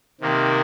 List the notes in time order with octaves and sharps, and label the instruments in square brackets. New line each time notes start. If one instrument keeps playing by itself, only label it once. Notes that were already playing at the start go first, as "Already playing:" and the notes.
[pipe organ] C3 D#3 A#3